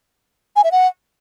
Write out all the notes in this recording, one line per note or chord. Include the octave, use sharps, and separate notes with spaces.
G#5
E5
F#5